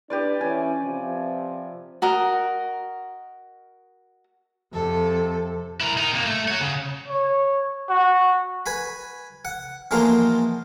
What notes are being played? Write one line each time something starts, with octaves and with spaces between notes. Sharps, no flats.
D4 G4 B4 D5
E3 C#4 G#5
C3 F3
F#4 A#4 D#5
F2 C3 A4
E4 A#4
D#4 A#4
C3 A#3
A3
F#4 C#5
C#3
C#5
F#4
B4 G#5 B5
F#5
E3 F3 G#3 A#3 F4 F#4